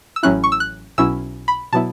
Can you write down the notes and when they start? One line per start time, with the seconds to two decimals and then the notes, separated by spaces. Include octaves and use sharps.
0.16 E6
0.23 A1 A2 F#3 C#4 E4 F#6
0.44 C#6
0.52 E6
0.60 F#6
0.98 B1 B2 F#3 C#4 E4 E6
1.48 B5
1.73 B2 F#3 B3 E4 A5